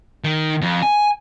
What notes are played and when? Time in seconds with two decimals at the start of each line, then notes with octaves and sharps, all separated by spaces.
0.24 D#3
0.62 F2
0.82 G#5